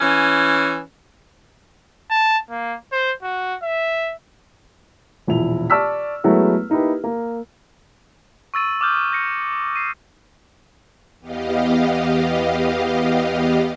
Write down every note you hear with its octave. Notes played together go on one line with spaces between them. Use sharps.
E3 C#4
A5
A#3
C5
F#4
E5
E1 A#1 E4 F7
D5 A5 C#6 E6 F6 B6
F#3 G#3 A3 B3 E4 G#4
A#3 D#4 E4 G4 B4
A#3
C#6 E6 A6 D#7
D6 D#6 F6 G6
G6 A#6 C#7
C7 D#7
E2 B3 G4 D#5 F5